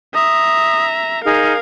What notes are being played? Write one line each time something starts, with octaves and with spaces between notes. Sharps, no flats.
E5 A#5 D#6
D#4 G#4 A#4 F5